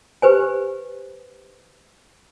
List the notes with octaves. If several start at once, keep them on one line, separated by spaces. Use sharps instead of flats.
G4 B4 C5 G#5